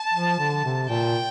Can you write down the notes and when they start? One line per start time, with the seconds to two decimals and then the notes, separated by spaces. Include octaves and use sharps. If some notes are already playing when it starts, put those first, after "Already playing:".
Already playing: A5
0.13 F3
0.39 D3
0.64 C3
0.89 A#2 G5